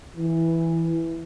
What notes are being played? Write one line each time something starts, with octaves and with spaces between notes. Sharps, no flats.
E3